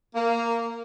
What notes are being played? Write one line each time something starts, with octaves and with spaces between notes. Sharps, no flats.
A#3